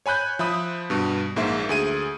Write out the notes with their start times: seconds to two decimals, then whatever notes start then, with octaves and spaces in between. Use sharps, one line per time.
0.06 C#5 G#5 B5 F#6 G6
0.39 F3 E5 B5 D#6
0.90 G2 B2
1.36 A#1 G#2 A#3 E5
1.69 D2 G#4 D#7